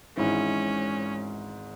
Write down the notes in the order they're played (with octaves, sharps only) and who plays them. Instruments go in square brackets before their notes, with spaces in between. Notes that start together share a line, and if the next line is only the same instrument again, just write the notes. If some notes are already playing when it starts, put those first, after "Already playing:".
[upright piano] G#1 G#2 E3 [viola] C#4